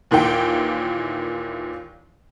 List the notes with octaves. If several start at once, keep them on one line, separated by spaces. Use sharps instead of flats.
D#2 A#2 E3 G5